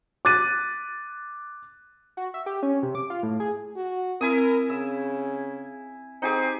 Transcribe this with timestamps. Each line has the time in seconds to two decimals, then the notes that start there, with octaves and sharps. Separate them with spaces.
0.25 D6 F#6 A6 D#7
2.17 F#4
2.34 E5
2.46 G4
2.63 C#4
2.83 C3
2.95 D6
3.10 F4
3.23 A2
3.40 G#4
3.76 F#4
4.21 C4 E4 A#4 G#5 D#6
4.70 C#3 E6
6.22 C4 D#4 G4 G#4